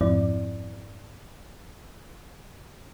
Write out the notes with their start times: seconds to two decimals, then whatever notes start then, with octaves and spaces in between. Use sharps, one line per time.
0.01 F2 G#2 F3 C4 E4 D5